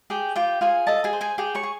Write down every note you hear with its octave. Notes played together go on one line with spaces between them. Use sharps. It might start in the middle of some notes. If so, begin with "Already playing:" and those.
G4 G#4 G5
F4 G4 G5
F4 G#4 G#5
A4 D#5 A5
G#4 G#5
C5
G#4 G#5
G4 G#4 G5
C#5 C#6
G#4